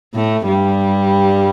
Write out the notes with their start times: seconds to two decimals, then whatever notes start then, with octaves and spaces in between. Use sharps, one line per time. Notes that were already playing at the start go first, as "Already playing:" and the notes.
0.14 A2 A3
0.48 G2 G3